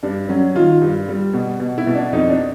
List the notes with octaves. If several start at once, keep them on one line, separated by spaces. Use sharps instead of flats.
G2 D4
F#3 C#4
D#3 F4
G2
G3
B2
B2
E4
B2
D4
F2 D#4
D4